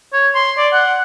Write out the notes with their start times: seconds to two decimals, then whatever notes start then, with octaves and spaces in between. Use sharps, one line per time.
0.13 C#5
0.35 C6
0.58 D5
0.73 F#5